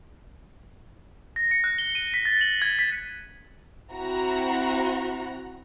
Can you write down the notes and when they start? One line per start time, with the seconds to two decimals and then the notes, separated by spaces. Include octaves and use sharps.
1.36 A#6
1.51 C#7
1.64 F#6
1.78 G7
1.95 D#7
2.14 B6
2.25 A6
2.41 F#7
2.62 G#6
2.79 B6
3.92 C4 E4 F#4 F#5 A#5